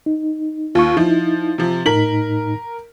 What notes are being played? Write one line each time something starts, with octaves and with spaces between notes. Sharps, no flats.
D#4
D#2 F4 C#6
F3 D#4 E4
C3 F3
A2 D#4 A#4 B6 F#7